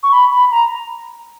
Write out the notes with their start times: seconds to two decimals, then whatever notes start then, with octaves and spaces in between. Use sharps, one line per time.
0.03 C#6
0.12 B5
0.32 B5
0.51 A#5